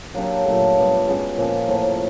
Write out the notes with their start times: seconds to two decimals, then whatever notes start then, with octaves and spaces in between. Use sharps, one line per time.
0.14 F#3 A#3 D4 G4
0.46 A#2 F#3 A3
0.76 G3 B3 D4
1.08 G#3 C#4 F#4
1.37 A#2 F3 A#3 C#4
1.68 A2 F3 A#3